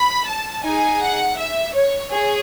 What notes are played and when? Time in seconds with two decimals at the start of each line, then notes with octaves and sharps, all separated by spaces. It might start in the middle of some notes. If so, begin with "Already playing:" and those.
Already playing: B5
0.27 A5
0.63 D#4 G#4 G#5
1.01 F#5
1.38 E5
1.74 C#5
2.12 G#4 C#5